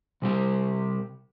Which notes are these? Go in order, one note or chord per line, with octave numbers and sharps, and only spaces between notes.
C3 G3 G4